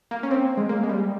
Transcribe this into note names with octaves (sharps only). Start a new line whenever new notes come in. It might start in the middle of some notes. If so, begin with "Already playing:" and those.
A#3
C#4
C4
G#3
A#3
G#3
G3